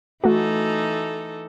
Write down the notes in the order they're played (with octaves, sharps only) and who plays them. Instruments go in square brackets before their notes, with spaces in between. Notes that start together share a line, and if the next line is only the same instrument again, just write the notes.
[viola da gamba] E3 D#4 A4 [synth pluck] A3 F#4